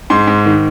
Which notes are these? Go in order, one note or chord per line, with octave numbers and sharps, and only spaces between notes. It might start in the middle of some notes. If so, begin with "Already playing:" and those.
G#2 C6
G#2
D#3